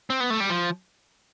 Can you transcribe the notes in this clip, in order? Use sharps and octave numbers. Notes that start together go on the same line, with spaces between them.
C4
B3
A3
G3
F3